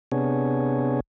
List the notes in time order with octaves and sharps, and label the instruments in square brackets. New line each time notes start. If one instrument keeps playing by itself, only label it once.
[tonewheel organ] C3 B3 D4 G#4 C#5